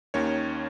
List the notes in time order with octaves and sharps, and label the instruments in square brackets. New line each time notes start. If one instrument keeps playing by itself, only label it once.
[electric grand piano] D#2 D#3 A#3 C#4 C#5